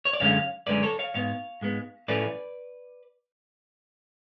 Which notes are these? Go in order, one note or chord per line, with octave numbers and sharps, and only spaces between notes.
C#5
D5
F#2 D3 G#3 C#4 C#5 F5
F#2 D3 G#3 C#4 B4 D5
A4 C#5
C#5 F5
G#2 G#3 B3 C#5 F5
G#2 G#3 B3
A2 F3 A3 C#4 B4 D5